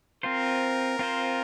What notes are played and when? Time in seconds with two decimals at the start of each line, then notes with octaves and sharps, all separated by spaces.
0.23 C4 F4 A#4 C5
0.99 C4 F4 C5